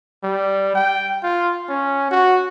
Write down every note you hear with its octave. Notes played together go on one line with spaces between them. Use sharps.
G3
G5
F4
C#4
F#4